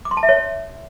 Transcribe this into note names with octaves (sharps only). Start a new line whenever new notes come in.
D6
C6
A5
E5
C#5